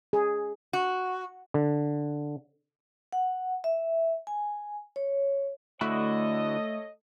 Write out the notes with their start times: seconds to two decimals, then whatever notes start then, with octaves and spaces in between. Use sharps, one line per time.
0.13 G#4
0.73 F#4
1.54 D3
3.13 F#5
3.64 E5
4.27 G#5
4.96 C#5
5.81 D3 A3 E4 F#4 A4 C#5 D#5